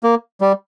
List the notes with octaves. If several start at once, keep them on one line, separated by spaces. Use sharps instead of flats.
A#3
G3